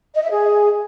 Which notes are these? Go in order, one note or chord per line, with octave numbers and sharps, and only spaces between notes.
D#5
E5
G#4